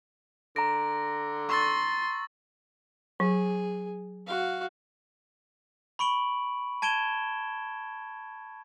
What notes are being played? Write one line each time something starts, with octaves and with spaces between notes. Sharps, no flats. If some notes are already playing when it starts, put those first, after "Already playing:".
D3 A#5 A#6 D7
C6 C#6 E6 A6
F#3 G#4
F#4 F5
B5 C#6 D7 F#7
A5 G#6 D7 E7 G7